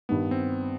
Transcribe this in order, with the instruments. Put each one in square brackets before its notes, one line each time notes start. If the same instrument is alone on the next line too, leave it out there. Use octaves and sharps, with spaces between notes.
[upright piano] G2 D#3 G3 [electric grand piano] B3
[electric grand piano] C4